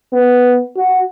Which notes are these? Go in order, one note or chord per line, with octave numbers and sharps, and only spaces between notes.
B3
F#4